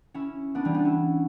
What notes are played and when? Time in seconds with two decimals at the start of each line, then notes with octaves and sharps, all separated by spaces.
0.14 C#4 E4
0.55 B3 D4
0.65 E3 G3
0.74 B3 D4
0.85 C#4 E4